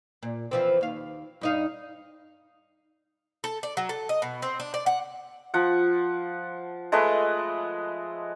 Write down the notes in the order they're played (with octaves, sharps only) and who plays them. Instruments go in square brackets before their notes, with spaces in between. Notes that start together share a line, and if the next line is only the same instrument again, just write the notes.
[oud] A#2
E3 F3 C4
D#2 F5
G2 D#4 F5
[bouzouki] A4
D5
F#3
A4
D#5
B2
C4
D4
D5
F#5
[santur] F3 F#5
G#3 A3 B4 D#5